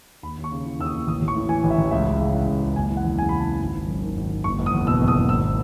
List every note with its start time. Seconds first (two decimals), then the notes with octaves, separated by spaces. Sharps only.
0.23 D#2 B5
0.38 D#2
0.44 C#6
0.52 C#3
0.66 E3
0.79 D#2 E6
0.86 D#6
0.93 D#2
1.07 A1 D#6
1.22 A1
1.28 C#6
1.35 A2
1.49 E3 G#5
1.64 A1
1.70 E5
1.78 A1
1.91 C#2 E5
2.06 C#2
2.20 C#3
2.34 E3
2.48 C#2
2.62 C#2
2.76 F#1 G#5
2.90 E3
2.97 F#5
3.04 E2
3.18 C#3 G#5
3.29 F#1 B5
3.40 A5
3.46 E3
3.61 G#1
3.74 G#1
3.88 F#2
4.02 D#3
4.17 G#1
4.30 G#1
4.44 F#1 C#6
4.59 F#1
4.66 D#6
4.74 E2
4.87 B2 E6
5.02 F#1
5.08 D#6
5.15 F#1
5.29 G#1 E6